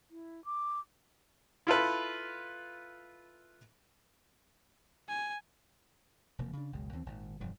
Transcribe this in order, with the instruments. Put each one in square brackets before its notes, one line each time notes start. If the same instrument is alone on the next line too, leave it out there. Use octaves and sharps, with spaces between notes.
[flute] E4
D6
[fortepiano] E4 F4 A4 B4
[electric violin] G#5
[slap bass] E1 C3 F3 A#3
C#3 D4
F#1 C#2 B2 G#3
D#2 E3 B3 C4
G#1 A#2 D#3
E1 G2 F3